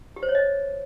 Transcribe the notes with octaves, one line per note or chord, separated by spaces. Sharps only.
G4
C5
C#5
D#5